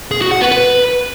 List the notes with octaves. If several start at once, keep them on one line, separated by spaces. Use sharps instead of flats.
G#4
F#4
F#5
B4
B4